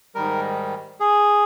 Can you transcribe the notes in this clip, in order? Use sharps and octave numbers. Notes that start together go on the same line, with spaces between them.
G#2 D#3 G3 A#4
G#4